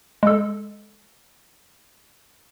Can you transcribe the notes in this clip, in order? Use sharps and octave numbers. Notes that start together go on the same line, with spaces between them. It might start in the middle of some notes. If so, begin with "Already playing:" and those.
G#3 A4